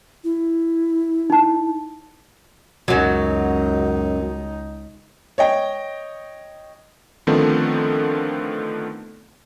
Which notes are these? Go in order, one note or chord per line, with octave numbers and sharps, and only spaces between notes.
E4
D#4 A5
C#2 F#2 F#3 D#4
C#5 D#5 G5
D3 D#3 F3 A3 B3 C4